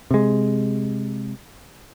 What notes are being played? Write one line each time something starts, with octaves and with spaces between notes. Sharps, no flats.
C3 G#3